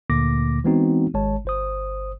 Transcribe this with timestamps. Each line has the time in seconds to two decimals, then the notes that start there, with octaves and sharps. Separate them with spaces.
0.10 D2 A#2 D3 A#3 D6 A#6
0.64 E3 G#3 B3 C4 D#4 F#4
1.14 G#1 G#3 C#5 A5
1.45 G1 C5 D#6